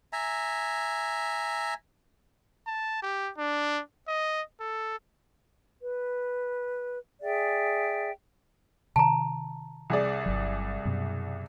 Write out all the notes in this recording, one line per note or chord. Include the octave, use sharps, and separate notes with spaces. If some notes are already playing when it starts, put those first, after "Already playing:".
E5 G#5 A#5
A5
G4
D4
D#5
A4
B4
G#4 D5 E5 G5
C3 D#3 A5 A#5
C2 G#4 D5
G1 F#3
F#2 B2